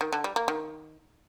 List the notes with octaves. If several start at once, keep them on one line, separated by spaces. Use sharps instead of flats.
D#3
D3
G3
A#3
D#3